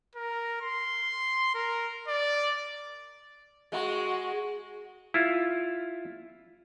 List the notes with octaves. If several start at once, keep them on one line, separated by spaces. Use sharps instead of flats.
A#4
C6
A#4
D5
G#3 F#4
E4 F4